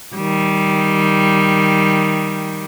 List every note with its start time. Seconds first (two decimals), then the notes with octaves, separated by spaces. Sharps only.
0.15 D#3 G3